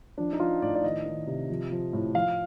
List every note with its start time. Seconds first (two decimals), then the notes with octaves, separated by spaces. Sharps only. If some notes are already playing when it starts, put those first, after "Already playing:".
0.18 F3 D4
0.33 D#4
0.40 F3 F4
0.62 A2 D5
0.75 D5
0.83 D#3 D#5
1.06 D#3
1.27 C3
1.50 F3
1.71 F3
1.93 A2
2.14 F3 F5